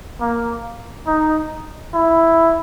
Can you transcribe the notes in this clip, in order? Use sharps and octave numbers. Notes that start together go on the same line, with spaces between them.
A#3
D#4
E4